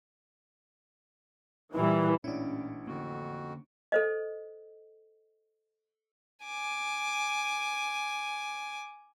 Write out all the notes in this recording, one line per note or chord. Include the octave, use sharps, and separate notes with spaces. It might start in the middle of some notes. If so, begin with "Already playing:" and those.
A#2 E3 G3
A1 A#2 G3 C#4 D4 E4
F2 D3 A#3 F#4
A4 C5 D#5
G#5 D6